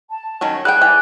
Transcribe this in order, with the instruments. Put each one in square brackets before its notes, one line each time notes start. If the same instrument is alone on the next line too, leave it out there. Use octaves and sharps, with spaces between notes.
[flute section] A5
[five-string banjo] D#3 F#3 C#4
[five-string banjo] G3 F#5 G5 [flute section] G#4 [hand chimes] F#6
[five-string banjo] E3 G5 [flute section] D5 G#5 D6